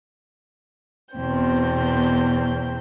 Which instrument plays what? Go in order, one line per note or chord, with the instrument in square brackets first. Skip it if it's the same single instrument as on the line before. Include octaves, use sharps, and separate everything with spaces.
[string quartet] E2 B2 C4 G6